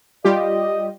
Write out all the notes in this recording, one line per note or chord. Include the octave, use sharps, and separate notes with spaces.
G3 F4 G4 D5 D#5